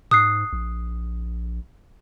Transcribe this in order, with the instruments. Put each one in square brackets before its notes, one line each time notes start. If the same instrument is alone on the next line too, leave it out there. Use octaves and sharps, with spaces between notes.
[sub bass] G#2 [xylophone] D#6 F#6 C7
[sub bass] A#1